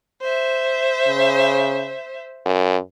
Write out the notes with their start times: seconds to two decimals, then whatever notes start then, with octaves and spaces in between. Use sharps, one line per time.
0.22 C5 E5
1.07 C#3
2.46 F#2